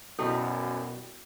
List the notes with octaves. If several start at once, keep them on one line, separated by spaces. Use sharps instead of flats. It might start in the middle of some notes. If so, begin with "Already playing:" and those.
F#2 B2 G3 E4 F#4 A4